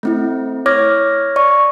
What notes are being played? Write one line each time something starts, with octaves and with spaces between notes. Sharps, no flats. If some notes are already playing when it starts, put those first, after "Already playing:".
A3 C4 E4
C#5 D6 F6 G#6 A#6
D5 C#6